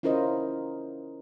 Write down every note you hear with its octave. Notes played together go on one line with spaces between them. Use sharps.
C#4 E4 F4 A#4 C5 D#5